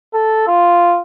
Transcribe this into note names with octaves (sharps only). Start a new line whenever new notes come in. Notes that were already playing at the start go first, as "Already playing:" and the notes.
A4
F4